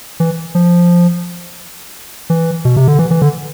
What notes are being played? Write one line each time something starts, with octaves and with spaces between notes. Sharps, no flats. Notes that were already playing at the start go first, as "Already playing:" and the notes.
E3
F3
E3
B2
C3
D3
E3
E3
D3